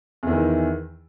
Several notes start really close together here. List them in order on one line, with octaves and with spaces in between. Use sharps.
E2 E3 D#3